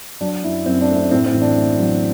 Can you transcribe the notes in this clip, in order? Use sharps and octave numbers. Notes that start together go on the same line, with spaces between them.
F#3 D4
F#2 E4
F#2 C4
D4
A3
C4
A2 C4
C4
A1
D4
A3
F#3